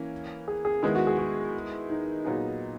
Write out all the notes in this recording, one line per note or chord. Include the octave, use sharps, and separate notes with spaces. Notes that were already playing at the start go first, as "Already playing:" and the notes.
Already playing: E3 A#3 C#4
G#4
G#4
D#3 G#3 B3 E4 G#4
F#4
G#4
F#4
D#4
A#2 F#3 B3 D#4 G#4